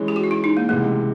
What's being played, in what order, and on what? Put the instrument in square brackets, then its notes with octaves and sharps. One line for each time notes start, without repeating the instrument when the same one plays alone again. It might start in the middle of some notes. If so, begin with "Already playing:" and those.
Already playing: [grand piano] E3 G#3 C#4
[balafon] G4
F#4
F4
E4
D#4
A#3
[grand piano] C#2 C3 E3 G#3 [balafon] A3